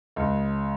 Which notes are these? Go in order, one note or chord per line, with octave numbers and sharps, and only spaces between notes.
C#2